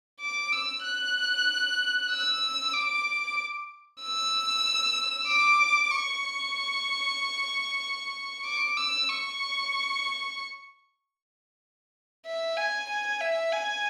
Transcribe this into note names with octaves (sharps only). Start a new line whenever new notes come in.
D6
E6
F#6
E6
D6
E6
D6
C#6
D6
E6
C#6
E5
G#5
G#5
E5
G#5